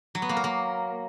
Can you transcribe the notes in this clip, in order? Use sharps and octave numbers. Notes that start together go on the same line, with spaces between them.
F#3
B3
A#3
A#4
A#3